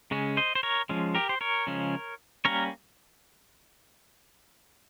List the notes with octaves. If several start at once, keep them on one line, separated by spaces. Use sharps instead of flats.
C#3 G#3 C#4
C5 D#5
C5
A#4 C#5
F3 G#3 C#4
G4 A#4
C5
A#4 C#5
C#3 F3 G#3 C#4
G3 A#3 C#4 A#4 C#5